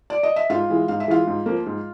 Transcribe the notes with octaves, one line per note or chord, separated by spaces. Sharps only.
D5
D#5
E5
G#2 F4 F5
E3 G#3
G#2 F5
E5
E3 G#3 F4 F5
G#2
F3 A#3
G#2